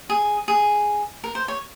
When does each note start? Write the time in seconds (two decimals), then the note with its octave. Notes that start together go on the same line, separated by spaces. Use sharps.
0.10 G#4
0.48 G#4
1.24 A#4
1.35 C5
1.48 C#5